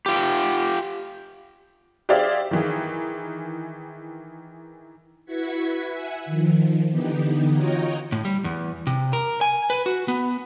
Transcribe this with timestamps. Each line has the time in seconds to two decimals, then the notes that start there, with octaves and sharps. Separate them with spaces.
0.06 F4 G4
2.09 G4 G#4 C5 D5 E5 F5
2.51 D#3 E3 G#4
5.26 E4 F#4 B4 G#6 B6 C#7
5.90 E5 F#5 G#5
6.26 D#3 F3
6.90 D3 E3 B3 D#4 G4
7.53 F4 F#4 C#5 D#5 G5 A#5
8.12 A2
8.25 G3
8.44 E2
8.87 C3
9.13 A#4
9.41 G#5
9.70 B4
9.86 F#4
10.08 B3